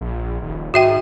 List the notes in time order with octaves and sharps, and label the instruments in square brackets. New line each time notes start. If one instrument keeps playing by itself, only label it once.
[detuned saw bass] A#1
D#1
[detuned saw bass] G#2 [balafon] F#4 E5 G5